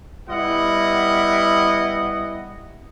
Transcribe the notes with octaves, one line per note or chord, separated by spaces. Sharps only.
G3 B3 E4 D#5 F#5